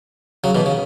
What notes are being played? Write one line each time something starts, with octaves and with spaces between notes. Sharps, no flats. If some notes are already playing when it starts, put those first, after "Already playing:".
C#3 F#3
B2 E3
C#3